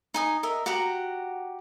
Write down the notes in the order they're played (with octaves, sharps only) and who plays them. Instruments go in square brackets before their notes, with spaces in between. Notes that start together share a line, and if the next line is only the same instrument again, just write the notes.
[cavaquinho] D#4 G#5 D#6
A#4 D#5 E5
F#4 G4 F#5 A#5